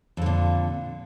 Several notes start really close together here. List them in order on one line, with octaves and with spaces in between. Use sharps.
F2 D3 A#2